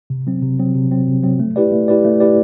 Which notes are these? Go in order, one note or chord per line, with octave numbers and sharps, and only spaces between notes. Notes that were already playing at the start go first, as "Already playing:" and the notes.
C3
F#3 C4
C3
F#3 C4
C3
F#3 C4
C3
F#3 C4
A3
E4 G4 B4 D5
A3
E4 G4 B4 D5
A3
E4 G4 B4 D5